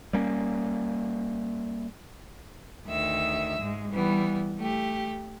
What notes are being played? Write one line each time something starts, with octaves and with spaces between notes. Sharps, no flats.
G3 A#3 C#4
D2 D#3 E5 E6
G#2 G#3
E3 G3 B3
A3 G4